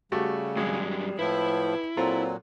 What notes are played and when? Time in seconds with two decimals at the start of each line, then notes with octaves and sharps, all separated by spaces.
0.12 C#3 G3 A3 F#4 G4
0.56 G#1 G2 F#3 G#3
1.19 A2 F3 E4 B4
1.97 A#2 F#3 C4 F4 A4 A#5